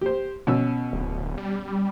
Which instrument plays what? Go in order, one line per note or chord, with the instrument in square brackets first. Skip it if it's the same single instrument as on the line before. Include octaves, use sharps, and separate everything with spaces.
[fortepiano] G4 C5
B2 C#4 E6
[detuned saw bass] D1
G3